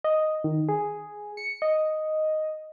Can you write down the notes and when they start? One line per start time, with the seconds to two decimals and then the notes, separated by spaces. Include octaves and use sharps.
0.04 D#5
0.44 D#3
0.69 G#4
1.37 C#7
1.62 D#5